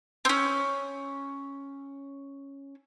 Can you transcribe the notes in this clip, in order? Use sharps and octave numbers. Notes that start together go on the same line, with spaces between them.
C4 C#4